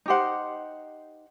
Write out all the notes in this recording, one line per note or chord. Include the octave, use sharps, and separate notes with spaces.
D#4 G4 C5 F#5